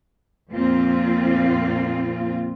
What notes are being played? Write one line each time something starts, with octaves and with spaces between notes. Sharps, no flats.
F2 A#2 A#3 C4 F4